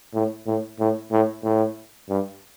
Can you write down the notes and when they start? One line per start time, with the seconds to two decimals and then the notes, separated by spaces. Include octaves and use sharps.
0.14 A2
0.46 A2
0.80 A2
1.12 A2
1.43 A2
2.09 G2